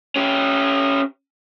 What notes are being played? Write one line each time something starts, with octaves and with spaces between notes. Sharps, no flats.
C#4 G4